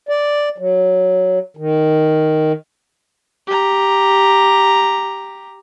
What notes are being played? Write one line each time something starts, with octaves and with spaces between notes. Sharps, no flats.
D5
F#3
D#3
G4 A#5